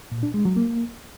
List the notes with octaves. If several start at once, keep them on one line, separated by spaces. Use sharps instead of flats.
A#2
D4
G#3
F#3
A#3